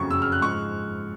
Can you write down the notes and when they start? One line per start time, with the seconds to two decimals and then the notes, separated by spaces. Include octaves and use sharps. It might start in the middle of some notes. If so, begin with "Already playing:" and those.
Already playing: F#1 F2 C#3 F#3 C#6
0.11 F#1 F2 C#3 F#3 E6
0.22 F6
0.32 F#6
0.41 G#2 F3 G#3 C#6